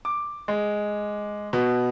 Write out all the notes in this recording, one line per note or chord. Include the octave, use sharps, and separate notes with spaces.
D6
G#3
B2